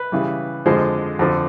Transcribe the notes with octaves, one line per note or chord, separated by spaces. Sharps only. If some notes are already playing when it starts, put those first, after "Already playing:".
Already playing: B4
C#3 E3 G3
F2 D3 F3 G#3 C5
F2 D3 F3